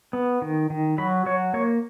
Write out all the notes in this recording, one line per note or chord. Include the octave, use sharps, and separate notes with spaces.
B3
D#3
D#3
F#3 B5
F#3 C#5
A#3 C#5